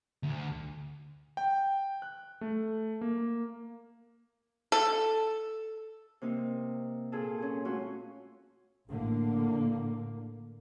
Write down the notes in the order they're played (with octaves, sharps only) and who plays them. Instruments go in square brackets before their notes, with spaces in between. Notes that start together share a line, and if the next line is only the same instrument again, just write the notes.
[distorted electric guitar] D2
[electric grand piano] G5
F#6
A3
A#3
[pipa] A4
[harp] C3 A#3 D#4
A#2 F4 G#4 A4 A5
C#4 G#4
A3 C#4 F4 F#4
[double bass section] A1 A2 D3 A#3